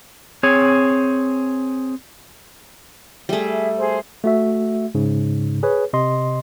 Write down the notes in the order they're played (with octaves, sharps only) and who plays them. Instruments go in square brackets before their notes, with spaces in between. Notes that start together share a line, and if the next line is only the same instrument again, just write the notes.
[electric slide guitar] C4 G#4 C#5
[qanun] G3 A3 [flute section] G#4 E5
[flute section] G#4 C5
[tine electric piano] A3 F#4 E5
G#2 C#3
G#4 B4 C#5
C3 D#5 C6